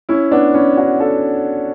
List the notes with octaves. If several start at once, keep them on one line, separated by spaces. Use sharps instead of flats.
C#4 E4
B3 D4
C#4 E4
D4 F#4
F#4 A4